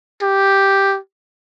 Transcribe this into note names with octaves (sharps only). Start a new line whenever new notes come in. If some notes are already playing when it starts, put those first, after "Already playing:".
G4